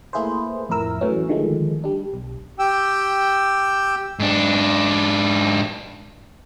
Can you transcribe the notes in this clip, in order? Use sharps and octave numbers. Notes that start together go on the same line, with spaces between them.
A3 A#3 E4 G#4 B4 C5
F2 A2 E4 A#4 E6
A2 E3 F#3 C#4
D3 D#3 F3 G#3 A3
G3 D4
B1
G4 G5 E6
G#2 D4